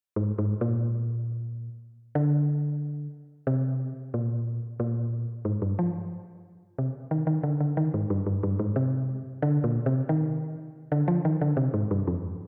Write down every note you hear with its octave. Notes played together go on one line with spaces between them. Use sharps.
G#2
G#2
A#2
D3
C3
A#2
A#2
G#2
G2
F3
C3
D#3
D#3
D3
D3
D#3
G#2
G2
G2
G2
G#2
C3
D3
A#2
C3
D#3
D3
F3
D#3
D3
C3
G#2
G2
F2